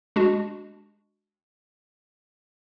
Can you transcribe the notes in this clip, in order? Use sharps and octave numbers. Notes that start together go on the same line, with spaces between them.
G#3 D4 F#4